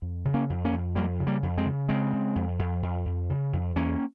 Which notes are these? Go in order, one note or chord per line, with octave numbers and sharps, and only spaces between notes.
F2
C#3
A#3 C#4
F2
A#3 C#4
F2
F2 G3 A#3
C#3
G3 A#3
F2
G#3 C4
C#3
C#3 G#3 C4
C#3
F2
F2
F2
F2
C#3
F2
E2 A#3 C#4